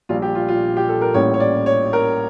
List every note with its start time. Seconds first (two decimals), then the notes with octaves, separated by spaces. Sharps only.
0.09 A#1 A#2 G3 F4
0.22 G4
0.35 F4
0.48 F4
0.77 G4
0.89 A4
1.01 A#4
1.14 A1 A2 G3 A#3 C#4 C#5
1.34 C#5
1.40 D5
1.66 C#5
1.93 A#4